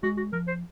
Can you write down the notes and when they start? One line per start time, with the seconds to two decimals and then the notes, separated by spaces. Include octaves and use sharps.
0.03 G#3 F#4
0.17 F#4
0.32 F3 A#4
0.47 C5